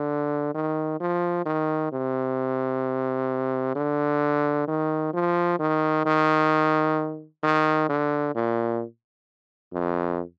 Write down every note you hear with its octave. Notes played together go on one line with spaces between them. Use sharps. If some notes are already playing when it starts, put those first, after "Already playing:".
Already playing: D3
D#3
F3
D#3
C3
D3
D#3
F3
D#3
D#3
D#3
D3
A#2
F2